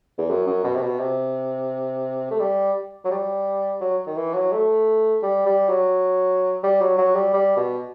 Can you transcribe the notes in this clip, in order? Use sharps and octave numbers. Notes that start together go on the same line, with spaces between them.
E2
F#2
F#2
B2
C3
B2
C3
A3
G3
F#3
G3
F#3
D#3
E3
F#3
A3
G3
G3
F#3
G3
F#3
F#3
G3
G3
B2